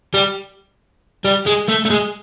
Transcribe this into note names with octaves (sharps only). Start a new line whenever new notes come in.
G3
G3
G#3
A3
A3
G#3